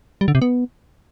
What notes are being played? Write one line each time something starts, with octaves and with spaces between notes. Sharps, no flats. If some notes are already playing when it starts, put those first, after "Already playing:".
G3
D3
C3
B3